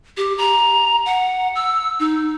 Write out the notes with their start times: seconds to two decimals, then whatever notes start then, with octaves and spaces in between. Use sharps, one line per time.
0.17 G4
0.38 A#5
1.06 F#5
1.55 E6
2.00 D#4